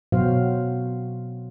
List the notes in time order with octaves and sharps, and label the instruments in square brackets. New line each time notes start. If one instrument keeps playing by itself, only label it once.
[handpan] B2 F#3 B3 F#4 C5 F5